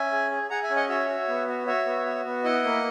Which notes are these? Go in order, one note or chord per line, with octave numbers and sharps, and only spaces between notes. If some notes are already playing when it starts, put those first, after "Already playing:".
Already playing: C#4 E5 G#5
G#4
G#4
G#4 F#5 A#5
E5 G#5
C#4
D#5 F#5
F#4 C#5 E5
F#4
B3
F#4
F#4 C#5 E5
B3
F#4
B3
E4 D#5 F#5
A#3